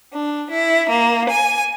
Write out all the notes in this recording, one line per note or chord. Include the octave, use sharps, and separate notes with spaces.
D4
E4
A#3
G#5